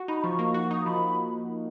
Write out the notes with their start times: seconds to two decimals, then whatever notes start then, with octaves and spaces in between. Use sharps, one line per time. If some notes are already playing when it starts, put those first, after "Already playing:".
Already playing: F#4
0.08 D#4 B5
0.19 B5
0.24 F3 C#6
0.39 A#3
0.54 F#4 C#6
0.70 D#4 D#6
0.86 F3 B5